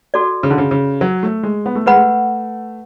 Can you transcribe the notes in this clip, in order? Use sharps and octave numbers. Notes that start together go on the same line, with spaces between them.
F#4 A4 D5
C#3
D3
C#3
C#3
F#3
A3
G#3
B3
A3
G#3 B4 F#5 B5
A3